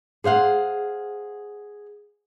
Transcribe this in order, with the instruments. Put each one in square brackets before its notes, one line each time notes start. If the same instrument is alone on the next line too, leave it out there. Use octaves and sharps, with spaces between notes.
[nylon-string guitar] G#4 C5 F5 F#5